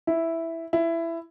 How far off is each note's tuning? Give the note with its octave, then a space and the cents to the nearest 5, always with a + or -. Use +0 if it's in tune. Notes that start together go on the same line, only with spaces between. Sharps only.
E4 +0
E4 +15